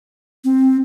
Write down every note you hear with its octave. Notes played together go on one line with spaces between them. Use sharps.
C4